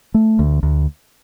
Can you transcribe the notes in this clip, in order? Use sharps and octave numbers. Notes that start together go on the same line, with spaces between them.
A3
D2
D2